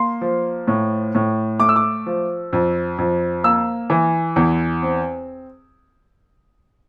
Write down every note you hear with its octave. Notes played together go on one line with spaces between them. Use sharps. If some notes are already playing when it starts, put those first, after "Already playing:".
Already playing: A#3 C6
F3
A2
A2
A3 D6
E6
D6
F3
F2
F2
A#3 E6
E3
E2
C4